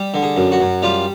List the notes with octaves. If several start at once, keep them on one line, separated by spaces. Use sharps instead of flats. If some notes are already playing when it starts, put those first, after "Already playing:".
Already playing: G3
D3
G#4
F#2
F#4
F#2
G3 F4